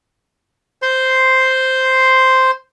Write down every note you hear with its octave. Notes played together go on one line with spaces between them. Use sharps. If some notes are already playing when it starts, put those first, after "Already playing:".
C5 C6